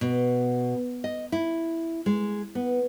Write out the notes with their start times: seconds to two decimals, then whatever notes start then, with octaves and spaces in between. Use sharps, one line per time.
0.01 B2
1.04 D#5
1.32 E4
2.06 G#3
2.55 B3